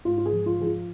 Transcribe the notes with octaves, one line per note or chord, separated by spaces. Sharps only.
G#2 F4
F4
G#4
F3
F4
F3 G#4
F4